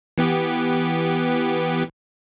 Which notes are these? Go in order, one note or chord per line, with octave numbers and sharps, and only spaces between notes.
E3 B3 G4